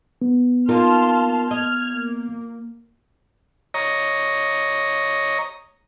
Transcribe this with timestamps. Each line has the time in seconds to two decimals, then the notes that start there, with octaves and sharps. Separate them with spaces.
0.22 B3
0.69 A#3 D#4 F4 A5 C6 F6
1.51 D#5 F6 G#6
1.92 A#3
3.74 C#5 D#5 A#5